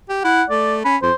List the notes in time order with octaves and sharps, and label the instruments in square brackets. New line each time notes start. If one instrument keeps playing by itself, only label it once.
[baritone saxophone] G4
[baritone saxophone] E4 [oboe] F#5
[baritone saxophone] A3 [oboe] D5
[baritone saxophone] C#4 [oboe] B5
[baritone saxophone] F2 [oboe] C5